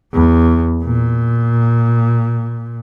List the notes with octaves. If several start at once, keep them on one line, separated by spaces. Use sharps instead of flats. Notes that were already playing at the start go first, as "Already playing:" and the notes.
E2
A#2